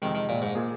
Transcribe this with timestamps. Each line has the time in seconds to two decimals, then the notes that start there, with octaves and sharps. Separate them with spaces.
0.02 F2 C3 D#3 G#3
0.15 D#3
0.29 A#2
0.42 G#2
0.55 A#2 A#3 G#4